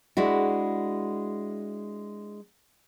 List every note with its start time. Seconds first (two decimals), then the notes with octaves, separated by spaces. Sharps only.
0.17 G#3 D4 E4 F#4